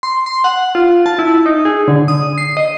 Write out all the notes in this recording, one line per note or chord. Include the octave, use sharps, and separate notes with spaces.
C6
C6
F#5
F4
A5
E4
D#4
G#4
D3
D#6
C7
D#5